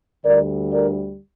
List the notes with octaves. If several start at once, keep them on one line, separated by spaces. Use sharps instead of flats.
D2 D3 G3 A#4 D5
A#4 D5